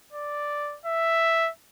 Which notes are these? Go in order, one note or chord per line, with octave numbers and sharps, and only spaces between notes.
D5
E5